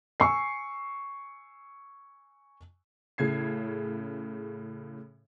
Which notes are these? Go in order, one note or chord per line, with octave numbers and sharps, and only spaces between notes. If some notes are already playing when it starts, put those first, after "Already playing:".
G#5 C#6 E6 C7
A2 C#3 G#6 C7